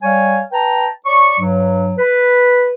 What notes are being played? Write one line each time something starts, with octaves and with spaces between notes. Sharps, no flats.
G3 C#5 F5 G#5
B4 G5 A5 A#5
C#5 D5 C#6
G2 F#3
B4